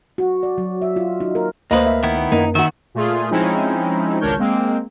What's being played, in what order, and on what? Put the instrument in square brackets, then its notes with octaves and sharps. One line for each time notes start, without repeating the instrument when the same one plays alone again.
[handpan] F#4
D5
F#3
E5
F4
D#4
A#4
[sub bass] D2 [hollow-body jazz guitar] A#3 B4 [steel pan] C5 D#5
[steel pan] E5
[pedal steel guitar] D#3 B3 E4
[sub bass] F#2 [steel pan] A#3 [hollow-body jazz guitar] D#4
[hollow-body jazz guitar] D#3 F#4 [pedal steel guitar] E5
[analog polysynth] A#2 A3 F4 G#4
F3 G#3 C4 C#4 D#4 E4
G#1 C#2 D4 A#4 C#5 G6
G#3 A#3 C4